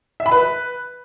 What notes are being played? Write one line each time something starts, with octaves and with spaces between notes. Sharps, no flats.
E5
B5
B4